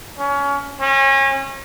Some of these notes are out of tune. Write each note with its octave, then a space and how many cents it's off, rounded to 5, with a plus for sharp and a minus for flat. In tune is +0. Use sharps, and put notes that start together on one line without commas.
C#4 +25
C#4 -30